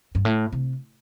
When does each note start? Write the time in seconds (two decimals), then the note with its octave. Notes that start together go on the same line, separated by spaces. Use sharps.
0.15 G2
0.25 A2
0.52 C3